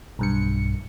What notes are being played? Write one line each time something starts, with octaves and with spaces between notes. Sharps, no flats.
B1 G2 C#7